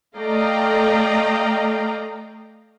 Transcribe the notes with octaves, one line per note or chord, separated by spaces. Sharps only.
A3 D5 D#5 F5 G5 A#5